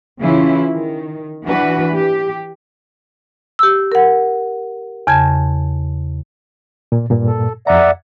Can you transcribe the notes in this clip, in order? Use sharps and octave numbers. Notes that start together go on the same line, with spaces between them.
C#3 E3 C#4 E4 F4
D#3
E3 D4 F#4 B4
G4
G4 E6
A#4 F#5
E2 C#3 A5 G#6
A#2
G2 A#2
A4
F2 D5 E5 F#5 A#5